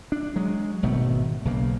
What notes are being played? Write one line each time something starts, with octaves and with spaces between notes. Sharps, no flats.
D4
F#3 G#3
G#1 B2 D#3 A3
B1 C#3 A#3